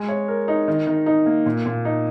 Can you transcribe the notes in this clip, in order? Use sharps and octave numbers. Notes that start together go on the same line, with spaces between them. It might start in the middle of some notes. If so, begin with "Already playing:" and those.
Already playing: G#3
C#5
A#4
D#4
D#3
D#3
D#4
A#3
A#2
A#2
D#4